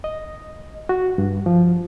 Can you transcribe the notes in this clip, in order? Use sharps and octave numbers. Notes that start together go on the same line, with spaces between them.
D#5
F#4
G2
F3